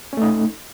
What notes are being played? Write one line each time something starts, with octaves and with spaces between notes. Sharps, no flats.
A3 C#4 D#4